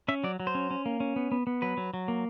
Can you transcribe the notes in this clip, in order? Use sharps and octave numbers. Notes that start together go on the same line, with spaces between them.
C#4 E5
F#3 D5
F#3
C5
C#4
C#4
A#3
C#4
B3
B3
B3
F#3 B4
F#3
F#3
A#3